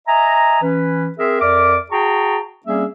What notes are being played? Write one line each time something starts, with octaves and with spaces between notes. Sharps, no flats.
D#5 E5 G#5 A#5
E3 C#4 B4
C4 G#4 A#4 E5
F2 A#4 D5 E5 D6
F#4 G#4 G5 A5 A#5 C#6
G3 A#3 C4 C#4 G#4 E5